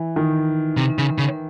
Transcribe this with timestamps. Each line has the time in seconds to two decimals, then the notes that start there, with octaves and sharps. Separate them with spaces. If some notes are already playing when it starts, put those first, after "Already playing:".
Already playing: E3
0.16 D#3
0.77 C3
0.98 C#3
1.18 C#3